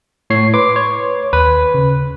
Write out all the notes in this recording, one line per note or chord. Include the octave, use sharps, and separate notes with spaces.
A2 C#5 C7
B4 C6 D6
C#5
D#2 B4
C#3